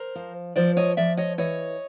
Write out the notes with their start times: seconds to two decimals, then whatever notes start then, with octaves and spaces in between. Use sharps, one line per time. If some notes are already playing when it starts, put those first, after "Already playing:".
Already playing: A#4 C5
0.15 F3
0.56 F3 C5 D5
0.77 C#5 D#5
0.97 F3 D5 E5
1.17 C#5 D#5
1.38 E3 C#5 D#5